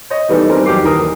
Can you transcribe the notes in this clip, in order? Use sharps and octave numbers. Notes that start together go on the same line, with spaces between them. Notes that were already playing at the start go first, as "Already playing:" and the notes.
C#5 D#5
D#3 E3 G3 B3 D#4 A4
D#3 G3 C4 D#4 A#4 C5
B1 E2 G4 D6 C7
D#1 D#3 E3 A#4 D#6